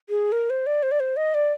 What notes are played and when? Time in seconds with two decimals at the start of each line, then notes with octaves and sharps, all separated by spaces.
0.09 G#4
0.32 A#4
0.50 C5
0.66 D5
0.83 C5
0.91 D5
1.00 C5
1.17 D#5
1.34 D5